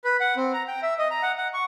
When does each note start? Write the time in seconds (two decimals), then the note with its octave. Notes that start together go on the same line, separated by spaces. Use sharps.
0.04 B4
0.20 F#5
0.36 C4
0.54 A#5
0.68 G5
0.82 E5
0.99 D#5
1.10 A#5
1.23 F#5
1.38 F#5
1.54 C#6